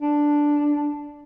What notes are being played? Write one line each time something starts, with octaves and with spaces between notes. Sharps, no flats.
D4